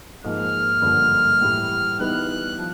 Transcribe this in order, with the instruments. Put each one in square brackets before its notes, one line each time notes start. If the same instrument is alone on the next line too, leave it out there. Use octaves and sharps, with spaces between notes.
[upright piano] G#2 F3 A#3 [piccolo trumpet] F6
[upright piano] G2 D3 F3 A#3
A2 E3 G3
[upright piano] E3 G3 B3 D#4 [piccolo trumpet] F#6
[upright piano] F3